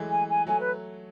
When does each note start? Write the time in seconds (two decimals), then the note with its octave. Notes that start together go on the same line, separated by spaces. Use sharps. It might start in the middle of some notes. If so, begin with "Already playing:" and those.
Already playing: E3 F#3 G#3 A3
0.10 G#5
0.29 G#5
0.47 F#3 A3 G#5
0.59 B4